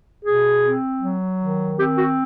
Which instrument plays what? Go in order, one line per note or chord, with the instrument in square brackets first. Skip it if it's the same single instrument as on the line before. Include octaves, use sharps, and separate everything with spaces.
[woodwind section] B2 G#4
C4
F#3
D#3
C4 G4
F#4